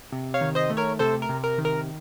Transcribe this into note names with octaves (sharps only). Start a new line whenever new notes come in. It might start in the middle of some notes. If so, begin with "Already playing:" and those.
C3
C#5 F5
D#3
C5 D#5
A3
A#4 C#5
C3 A4 C5
A#4
C3
A#4
D#3
A#4